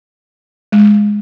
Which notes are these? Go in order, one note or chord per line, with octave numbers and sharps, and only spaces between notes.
G#3